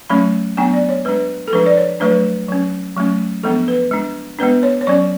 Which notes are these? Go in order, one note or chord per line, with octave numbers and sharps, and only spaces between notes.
F#3 A3 C#4 B5
F#3 B3 D4 G#5
D5
C#5
G#3 D4 B4
A4
F3 G#3 D4 B4
D5
C#5
F#3 A3 D4 B4
F#3 C#4
F#3 A3 C#4
F3 G#3 B3 D4 A4
B4
G#3 D4
G#3 B3 D4 B4
C#5
C#5
F#3 C#4 D5